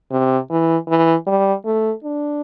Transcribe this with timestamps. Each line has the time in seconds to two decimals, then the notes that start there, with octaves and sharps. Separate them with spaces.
0.11 C3
0.50 E3
0.88 E3
1.27 G3
1.66 A3
2.04 D4